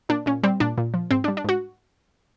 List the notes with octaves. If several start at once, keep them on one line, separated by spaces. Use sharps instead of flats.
A#2 D4
A#2 C#4
G3 C4
A#2 D4
A#2
F3
G#2 C4
D4
G3
D4
G#2 F#4